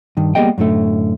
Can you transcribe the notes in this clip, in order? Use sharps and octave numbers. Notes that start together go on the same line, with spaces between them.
G2 D#3
G3 A#3 B3 G#4 D#5 G5
F#2 A2 D3 A3